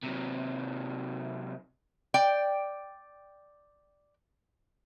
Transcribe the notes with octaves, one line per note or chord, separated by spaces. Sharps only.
C3 F#3
D5 G5